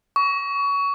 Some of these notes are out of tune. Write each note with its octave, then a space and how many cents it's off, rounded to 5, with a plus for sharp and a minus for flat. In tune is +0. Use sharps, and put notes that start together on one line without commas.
C#6 +25